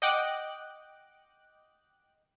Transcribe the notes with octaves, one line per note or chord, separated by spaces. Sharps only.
D#5 F#5 G5 D6 F#6